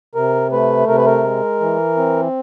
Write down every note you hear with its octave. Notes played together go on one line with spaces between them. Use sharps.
C3 A#4
A3 B4
C3 A#4
B4
A#4
G#3
E3
C4